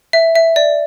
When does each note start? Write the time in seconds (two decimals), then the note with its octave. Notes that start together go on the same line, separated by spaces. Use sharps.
0.13 E5
0.36 E5
0.56 D5